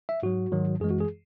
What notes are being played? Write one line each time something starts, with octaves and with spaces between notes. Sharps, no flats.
E5
G#2 F#3 F#4
G#2 D#3 F#3
F#2 E3 G#3 G#4
F#4
G#4